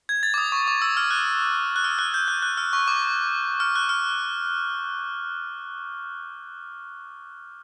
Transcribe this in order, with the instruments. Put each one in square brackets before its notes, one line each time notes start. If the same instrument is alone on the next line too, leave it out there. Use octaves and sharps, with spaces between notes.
[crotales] G#6
A6
D6
D#6
C#6
D6
E6
F6
F#6
F#6
F6
F#6
G6
F#6
F#6
F6
C#6
D6
F6
F#6
F6